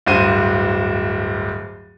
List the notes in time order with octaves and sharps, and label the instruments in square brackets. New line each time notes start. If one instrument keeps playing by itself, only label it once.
[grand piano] D1 G2 F#4 C5 D#7